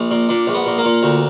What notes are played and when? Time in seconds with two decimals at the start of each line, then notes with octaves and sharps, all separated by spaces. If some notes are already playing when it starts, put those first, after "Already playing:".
Already playing: A#1
0.11 A#2
0.29 A#2 D4
0.47 A#1
0.55 B3
0.66 A#2
0.78 A#3
0.85 A#2
1.03 D2